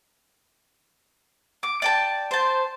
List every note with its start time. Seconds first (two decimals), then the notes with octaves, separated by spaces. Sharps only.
1.63 D6
1.82 D5 G5 A5
2.31 C5 A5